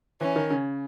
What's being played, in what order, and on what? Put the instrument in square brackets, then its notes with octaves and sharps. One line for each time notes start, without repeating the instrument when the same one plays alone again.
[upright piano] E3 [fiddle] C#4
[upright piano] D#3
C#3